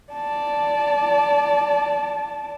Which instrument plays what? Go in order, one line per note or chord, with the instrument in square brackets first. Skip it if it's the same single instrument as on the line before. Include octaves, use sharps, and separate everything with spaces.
[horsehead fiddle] D5 A5